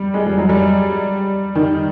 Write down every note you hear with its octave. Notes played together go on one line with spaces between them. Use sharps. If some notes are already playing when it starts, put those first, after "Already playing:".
Already playing: G3
G#3
G3
F#3
G3
D#3